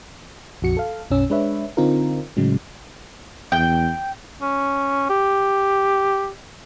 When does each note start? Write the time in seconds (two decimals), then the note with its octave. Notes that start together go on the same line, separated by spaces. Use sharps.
0.62 A#1 F2 F#4 C#7
0.77 A4 F5
1.11 B1 F#2 C#4 E6
1.30 G#3 D4 B4 C#5 E5
1.77 D3 C4 D#4 F4 A#4
2.37 A2 C#3 F#3 G#3
3.52 E2 G5
4.42 C#4
5.10 G4